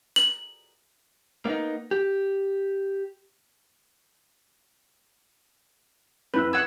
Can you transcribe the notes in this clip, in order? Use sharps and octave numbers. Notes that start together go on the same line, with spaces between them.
F#7
A#3 B3 D4 D#4
G4
F2 E4 B4 E6
F#5 E6 G#6